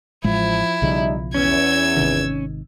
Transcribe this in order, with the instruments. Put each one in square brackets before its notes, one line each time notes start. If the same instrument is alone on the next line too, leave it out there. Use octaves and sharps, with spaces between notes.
[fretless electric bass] A1 A2 G#3 [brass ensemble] F3 [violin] E4
[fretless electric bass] B1 C#3 F3 [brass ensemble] G3 D#4 E5
[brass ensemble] E2 [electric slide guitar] C#4 [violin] E6 G#6
[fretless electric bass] G#1 C3 D#3